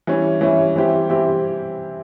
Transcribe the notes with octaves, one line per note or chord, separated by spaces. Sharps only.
E3 G3 C#4 E4
E3 G3 C#4 E4
E3 G3 C4 E4 G4
E3 G3 C4 E4 G4